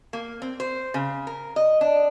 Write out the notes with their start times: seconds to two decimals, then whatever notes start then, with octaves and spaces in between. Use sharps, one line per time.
0.13 A#3
0.42 C4
0.60 C5
0.94 C#3
1.27 A#4
1.56 D#5
1.81 D4